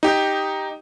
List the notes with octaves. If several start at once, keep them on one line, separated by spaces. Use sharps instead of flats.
D#4 G4